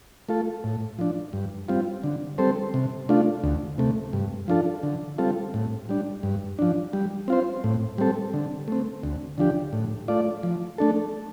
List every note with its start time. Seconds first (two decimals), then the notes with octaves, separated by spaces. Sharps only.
0.29 A3 F4 A4
0.64 A2
0.99 F3 D4
1.33 G2
1.69 G3 C4 F4
2.04 D3
2.38 G3 C4 A4 C5
2.74 C3
3.09 A3 D4 F4
3.44 D2
3.78 C3 A3
4.13 G2
4.48 F3 D4 F4 A4
4.83 D3
5.18 G3 C4 F4 A4
5.54 A2
5.89 G3 D4
6.23 G2
6.59 F3 D4
6.93 G3
7.28 C4 F4 C5
7.64 A2
7.98 G3 C4 A4
8.34 D3
8.68 A3 C4
9.03 D2
9.38 D3 F3 D4 G4
9.73 A2
10.08 A3 F4 D5
10.43 F3
10.78 A3 D4 A4